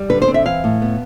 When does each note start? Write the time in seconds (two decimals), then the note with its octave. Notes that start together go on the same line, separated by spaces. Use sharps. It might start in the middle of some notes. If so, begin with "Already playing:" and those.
Already playing: G3
0.10 D3 B4
0.22 C5
0.28 C4
0.34 E5
0.46 E3 F5
0.64 A2
0.82 B3